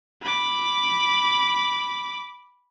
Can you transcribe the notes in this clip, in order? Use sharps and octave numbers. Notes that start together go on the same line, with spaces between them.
B5 D6